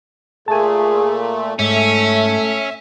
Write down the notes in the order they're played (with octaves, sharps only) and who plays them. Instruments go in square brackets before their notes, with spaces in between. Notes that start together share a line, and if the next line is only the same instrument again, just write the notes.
[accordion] A#2 A3 [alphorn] G#4 [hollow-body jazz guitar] G#5 A5
[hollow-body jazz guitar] G#2 [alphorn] A3 [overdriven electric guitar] C#4 [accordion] E5